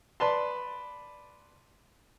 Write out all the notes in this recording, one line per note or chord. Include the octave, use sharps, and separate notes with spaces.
B4 D5 A5 C6